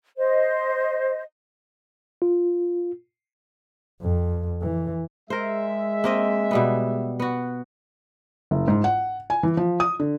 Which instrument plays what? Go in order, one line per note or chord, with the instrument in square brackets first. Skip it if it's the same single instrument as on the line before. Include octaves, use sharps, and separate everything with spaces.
[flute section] C5 D#5
[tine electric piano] F4
[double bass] F2
E3
[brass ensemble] G#3 E5 [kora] A#4 C5
[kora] A#3 C4 D#5
B2 G3 B3
B3 F#4
[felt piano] F#1
G#2
F#5
G#5
E3
F3
D#6
D3